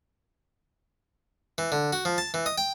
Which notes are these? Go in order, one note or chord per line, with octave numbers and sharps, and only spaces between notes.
E3
D3
F#4
F3
A5
E3
D#5
G5